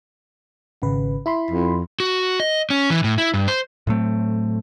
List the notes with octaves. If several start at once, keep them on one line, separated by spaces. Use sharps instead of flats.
G#1 C#3 B4
E4 B5 C6
F2
F#4
D#5
C#4
E3
A2
E4
G2
C5
A2 F#3 A3 C4